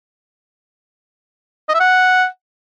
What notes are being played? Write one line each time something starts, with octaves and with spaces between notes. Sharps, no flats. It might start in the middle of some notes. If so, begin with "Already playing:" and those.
D#5
E5
F#5